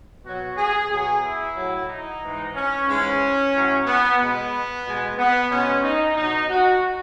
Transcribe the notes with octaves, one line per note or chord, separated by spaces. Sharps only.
B2 F#3 F#4
G#4
B2 F#3 G#4
E4
A2 F#3
D#4
G#2 E3 G#3
C#4
G#2 E3 G#3 C#4
A2 F#3
B3
B2 G#3 B3
B2 G#3
B3
B2 G#3 C#4
D#4
B2 F#3 D#4
F#4